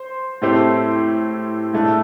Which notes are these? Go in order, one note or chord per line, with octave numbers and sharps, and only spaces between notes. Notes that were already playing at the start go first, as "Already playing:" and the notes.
Already playing: C5
A2 A3 C4 G4 C5
A2 A3 D4 A4